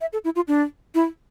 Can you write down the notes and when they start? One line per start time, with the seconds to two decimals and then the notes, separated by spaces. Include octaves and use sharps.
0.01 E5
0.13 A4
0.25 E4
0.36 F4
0.48 D4
0.95 E4